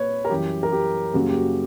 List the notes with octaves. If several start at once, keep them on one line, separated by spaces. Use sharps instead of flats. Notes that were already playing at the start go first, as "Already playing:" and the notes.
Already playing: A#2 A#3 B4 C#5
A#4
F#2 E3 G3 G4
A#4
G4
F#2 C#3 G3 A#3 F#4
G4
F#4